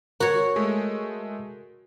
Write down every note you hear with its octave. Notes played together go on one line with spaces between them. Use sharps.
F#4 A#4 C#5
G#3 A3